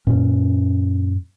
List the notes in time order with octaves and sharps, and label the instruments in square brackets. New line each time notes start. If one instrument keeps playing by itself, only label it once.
[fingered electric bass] F#2 A#2 C#4